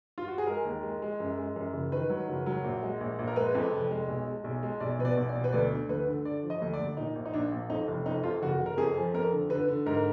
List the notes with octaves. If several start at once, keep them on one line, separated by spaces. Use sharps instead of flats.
F4
F#4
G#4
G#3 A#4
D#2
G#3
G#3
F#2
G#3
F#2
F#1
D#3 B4
F#3
F#1
F#3
A#1
G#3
A#1
A#1
A#4
G#3 B4
F2
F1
G#3
B1
G#3
B1
G#3
B1 D5
B2 B4
D5
B1
D5
B2
B4
D2 D5
D3
D2 B4
D3
D3 D5
F3
D#5
D2
D5
D2
A#2 D#4
A#1
D#4
A#1 D4
A#1
F2 D#4
F1
F2 D#4
F2 F4
F#1 F#4
F#1
A#4
F2 G#4
F3
F2 A#4
D3
D3 B4
D3
G#2 A#4